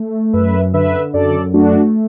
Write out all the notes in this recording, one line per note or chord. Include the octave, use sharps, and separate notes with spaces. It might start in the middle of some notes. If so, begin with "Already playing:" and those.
Already playing: A3
F#2 B4 E5
D3 B4 E5
F#2 A4 D5
A3 D4 F#4